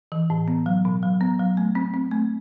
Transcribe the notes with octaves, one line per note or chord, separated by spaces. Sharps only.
E3
A2
B3
F#3
B2
F#3
B3
F#3
A3
C4
C4
A3